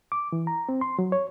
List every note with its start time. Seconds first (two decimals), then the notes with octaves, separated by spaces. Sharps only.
0.12 D6
0.32 E3
0.47 A#5
0.69 C4
0.81 C6
0.99 F#3
1.12 C#5